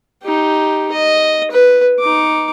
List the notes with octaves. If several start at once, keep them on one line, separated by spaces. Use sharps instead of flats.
D#4 G4
D#5
B4
D#4 D6